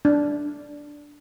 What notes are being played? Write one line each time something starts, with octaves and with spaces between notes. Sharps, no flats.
D4